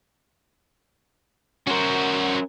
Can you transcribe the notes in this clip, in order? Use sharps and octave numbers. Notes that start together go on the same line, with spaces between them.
C#4 F#4 A#4 C5